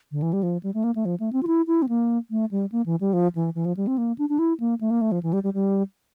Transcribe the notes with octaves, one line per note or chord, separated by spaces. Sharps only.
D3
E3
G3
F3
G3
A3
A#3
A3
F3
A3
C4
F4
E4
E4
C4
A#3
A3
G3
A#3
E3
G3
F3
E3
E3
F3
G3
C4
A#3
D4
D4
E4
A#3
A3
A#3
A3
F3
E3
G3
G3
G3